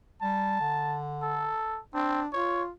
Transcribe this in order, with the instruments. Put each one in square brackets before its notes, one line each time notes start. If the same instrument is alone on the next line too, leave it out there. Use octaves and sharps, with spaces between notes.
[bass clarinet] G3 [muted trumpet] A5
[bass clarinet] D3
[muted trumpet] A4
[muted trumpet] C4 [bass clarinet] D4
[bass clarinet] F4 [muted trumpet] C#5